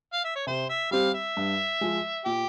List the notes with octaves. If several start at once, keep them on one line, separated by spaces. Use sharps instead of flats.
F5
E5
C#5
C3 C5
E5
G3 C4 G4 F5
E5
G2
F3 G#3
A#2 G4